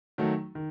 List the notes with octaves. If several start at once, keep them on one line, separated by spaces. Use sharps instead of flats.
D#3 F#3 A3
D#3